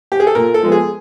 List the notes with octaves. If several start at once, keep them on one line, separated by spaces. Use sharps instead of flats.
G4
G#4
A4
A#2 A#4
A4
F3 G#3 B3
G#4